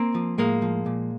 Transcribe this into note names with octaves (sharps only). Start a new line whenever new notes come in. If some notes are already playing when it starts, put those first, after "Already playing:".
Already playing: A#3 C4
F3
A2 G#3 A#3
F3
A#2